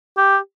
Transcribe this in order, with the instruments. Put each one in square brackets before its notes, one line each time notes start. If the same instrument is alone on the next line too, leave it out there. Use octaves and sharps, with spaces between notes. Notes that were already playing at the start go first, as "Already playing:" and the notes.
[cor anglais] G4